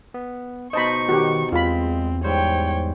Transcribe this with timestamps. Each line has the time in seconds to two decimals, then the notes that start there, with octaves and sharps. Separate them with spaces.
0.14 B3
0.73 B2 D#4 C5 D#5 A5 B5 C#6
1.09 D#3 F#4 G4
1.52 E2 G#3 C4 F4 B5
2.24 G#2 G3 C5 C#5 G5